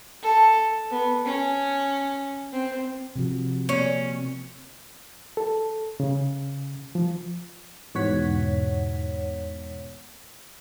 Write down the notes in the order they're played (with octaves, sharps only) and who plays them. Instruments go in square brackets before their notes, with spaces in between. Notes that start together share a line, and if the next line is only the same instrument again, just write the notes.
[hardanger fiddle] A4
B3
C#4
C4
[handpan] C3 F3 F#4
[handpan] A#3 C4 [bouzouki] C#4
[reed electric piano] A4
C#3
F3
[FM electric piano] E2 G#2 B2 C#5 F#5 B6